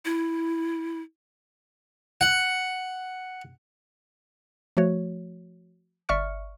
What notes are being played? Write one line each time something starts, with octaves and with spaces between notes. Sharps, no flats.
E4
F#5
F3 A3 F#4 C#5
G1 D5 E5 C#6 F6 C#7